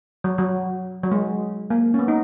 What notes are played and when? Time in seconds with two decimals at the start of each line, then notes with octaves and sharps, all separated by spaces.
0.24 F#3
0.38 F#3
1.03 F#3
1.12 G#3
1.70 A#3
1.94 C#4
1.99 B3
2.08 D#4